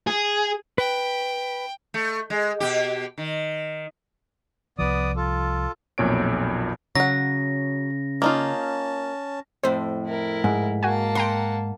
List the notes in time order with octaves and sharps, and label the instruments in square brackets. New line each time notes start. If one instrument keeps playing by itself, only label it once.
[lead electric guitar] G#4
[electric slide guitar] B4 [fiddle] G5
[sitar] A3
G#3
B2 G4
D#3
[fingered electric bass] C2 F3 [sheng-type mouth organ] B3 D5 D#6
[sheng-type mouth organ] F4 A4
[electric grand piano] B1 F2 A#2 C#5 D7
[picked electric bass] C#3 [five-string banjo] F#3 F#5 [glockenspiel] A#6
[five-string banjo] A#3 D#4 F4 [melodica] C#4 A5
[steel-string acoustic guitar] F2 A2 [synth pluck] C5
[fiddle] E4 A#4
[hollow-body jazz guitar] G#2
[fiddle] A#3 A5 [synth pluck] F#4 G#5
[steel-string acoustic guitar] F#5 [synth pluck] G5 A#5 C6